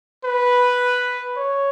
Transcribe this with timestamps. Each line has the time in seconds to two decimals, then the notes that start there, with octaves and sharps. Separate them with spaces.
0.25 B4
1.37 C#5